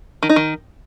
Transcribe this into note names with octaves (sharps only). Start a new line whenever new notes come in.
D#3
D#4
D#3